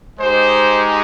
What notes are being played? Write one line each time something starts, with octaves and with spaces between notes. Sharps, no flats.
G#3 D#4 G4 C5